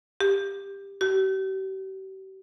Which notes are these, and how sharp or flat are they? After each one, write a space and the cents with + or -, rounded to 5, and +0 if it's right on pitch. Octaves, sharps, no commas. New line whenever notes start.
G4 +15
G4 -40